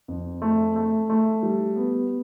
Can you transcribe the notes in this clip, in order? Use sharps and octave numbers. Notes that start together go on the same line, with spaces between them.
F2
A3
A3
A3
G3
B3